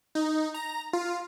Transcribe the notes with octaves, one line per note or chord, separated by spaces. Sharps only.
D#4
A#5
F4